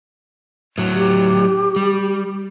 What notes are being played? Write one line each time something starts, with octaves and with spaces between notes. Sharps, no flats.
A2 F#3
G4
G3